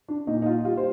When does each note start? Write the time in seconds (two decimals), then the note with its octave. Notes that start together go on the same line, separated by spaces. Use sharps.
0.08 D4
0.27 A#2 D#4
0.42 D#4
0.46 F4
0.65 G3 F4
0.77 C5